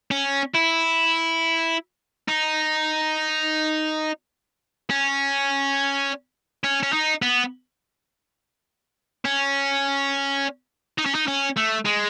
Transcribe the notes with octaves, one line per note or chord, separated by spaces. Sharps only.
C#4
E4
D#4
C#4
C#4
C#4
D#4
B3
C#4
D#4
C#4
D#4
C#4
A3
G#3